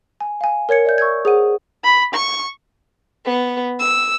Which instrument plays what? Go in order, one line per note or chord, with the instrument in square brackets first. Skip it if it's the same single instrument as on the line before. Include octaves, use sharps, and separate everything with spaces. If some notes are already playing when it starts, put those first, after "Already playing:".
[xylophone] G#5
F5 G#5
A#4 C#5 G#6 C#7
D5 E5 G6
C#6 E6 G6 G#6
G#4 C5 F#5 D#7
[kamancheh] B5
C#6
[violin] B3
E6